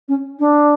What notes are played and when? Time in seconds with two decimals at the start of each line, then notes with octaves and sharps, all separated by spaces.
0.08 C#4
0.39 D4